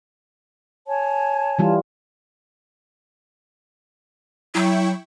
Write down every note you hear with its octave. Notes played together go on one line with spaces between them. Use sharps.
C#5 G#5 A5
E3 G3 F4
F#3 E4 G5 C#6